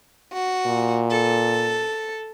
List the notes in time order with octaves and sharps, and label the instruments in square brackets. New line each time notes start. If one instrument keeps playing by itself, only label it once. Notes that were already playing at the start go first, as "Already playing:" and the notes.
[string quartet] F#4
[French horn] A#2
[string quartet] A4